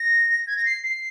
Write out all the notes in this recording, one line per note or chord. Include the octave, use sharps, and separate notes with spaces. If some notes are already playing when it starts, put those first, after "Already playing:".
Already playing: A#6
G#6
A#6
C7
C7